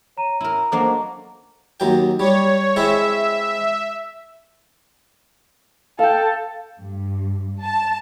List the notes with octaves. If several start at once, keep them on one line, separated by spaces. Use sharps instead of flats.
C#5 A#5 D#7
E4 A#4
F#3 A#3 D4 A4 C5 D#5
D#2 F#3 G5
G3 C#5
G#3 C4 E4 E5
A4 F5 G5
G2
A5